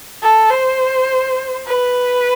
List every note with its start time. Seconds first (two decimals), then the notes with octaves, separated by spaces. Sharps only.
0.22 A4
0.50 C5
1.67 B4